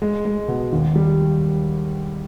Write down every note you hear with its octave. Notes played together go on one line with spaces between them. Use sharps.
G#3
G#3
B2
D#2
G3